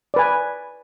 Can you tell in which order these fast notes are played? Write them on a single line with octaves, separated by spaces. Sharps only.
D5 B4 G#5